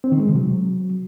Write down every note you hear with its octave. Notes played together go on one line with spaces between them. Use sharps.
C4
D#3
G#3
C3
F#3